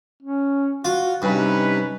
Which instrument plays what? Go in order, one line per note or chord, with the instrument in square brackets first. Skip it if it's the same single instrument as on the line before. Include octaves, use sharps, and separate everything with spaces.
[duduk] C#4
[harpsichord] F4 [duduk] F#4
[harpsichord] G2 [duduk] C3 [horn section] C#4 D#4 B4